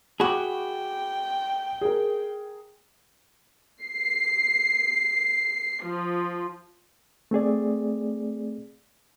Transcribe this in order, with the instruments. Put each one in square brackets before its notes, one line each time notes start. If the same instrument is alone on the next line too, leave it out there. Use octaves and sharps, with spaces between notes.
[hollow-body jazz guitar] F#4 G#4 [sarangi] G5 [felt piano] B5 D6
[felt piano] G#4 A#4
[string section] C7
F3
[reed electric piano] A3 C4 G#4 D5